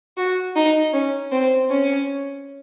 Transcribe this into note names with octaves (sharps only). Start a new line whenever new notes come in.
F#4
D#4
C#4
C4
C#4